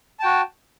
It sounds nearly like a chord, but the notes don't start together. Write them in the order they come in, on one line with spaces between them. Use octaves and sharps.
A5 G5 F#4